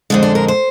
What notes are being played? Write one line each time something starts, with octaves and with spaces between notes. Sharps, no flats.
F2 D3 G#3 D4
D4
A#4
C5